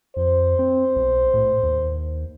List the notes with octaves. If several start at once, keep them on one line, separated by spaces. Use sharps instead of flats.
F2 C5
C4
B1
A2
D#2